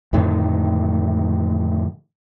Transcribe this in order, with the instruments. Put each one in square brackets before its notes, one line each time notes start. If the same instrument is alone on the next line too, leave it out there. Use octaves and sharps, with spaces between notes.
[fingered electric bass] F2 A2 D3 D#3